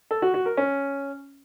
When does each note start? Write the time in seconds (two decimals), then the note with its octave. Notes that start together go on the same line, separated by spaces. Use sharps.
0.11 A4
0.22 F#4
0.34 F#4
0.46 A#4
0.57 C#4